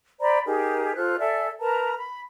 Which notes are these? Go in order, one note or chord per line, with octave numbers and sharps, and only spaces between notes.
C5 D5 A#5 B5
D#4 G4 G#4 A#4
F4 A4 C5 F#6
A4 D5 E5 G#5
A#4 B4 A5 A#5
B5